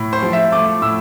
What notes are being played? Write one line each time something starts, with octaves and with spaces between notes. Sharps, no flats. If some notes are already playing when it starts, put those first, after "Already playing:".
Already playing: A2
C5
F3
E5
A3 D6
A2 E6